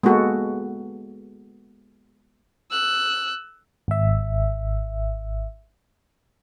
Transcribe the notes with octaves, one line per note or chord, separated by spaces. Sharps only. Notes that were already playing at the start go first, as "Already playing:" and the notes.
G#3 A#3 B3 F#4 A4
E6 F#6
G#1 E5